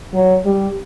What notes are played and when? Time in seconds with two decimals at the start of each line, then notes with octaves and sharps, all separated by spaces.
0.14 F#3
0.46 G3